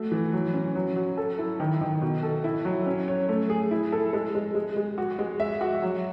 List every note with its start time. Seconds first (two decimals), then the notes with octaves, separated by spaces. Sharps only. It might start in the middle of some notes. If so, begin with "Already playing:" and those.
Already playing: A3 F#4
0.12 E3
0.33 F#3
0.54 C#4
0.75 F#3
0.96 F#3
1.17 A4
1.39 E4
1.60 D#3
1.81 D#3
2.02 B2
2.23 A4
2.44 E4
2.65 F#3
2.86 C#4
3.08 C#5
3.29 A3
3.50 G#4
3.71 E4
3.92 A4
4.13 G#3
4.35 G#3
4.55 G#3
4.76 G#3
4.98 F#4
5.19 G#3
5.40 E5
5.61 F#4
5.82 F#3